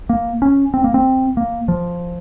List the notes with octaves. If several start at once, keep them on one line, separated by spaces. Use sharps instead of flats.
A#3
C#4
C4
A#3
C4
A#3
F3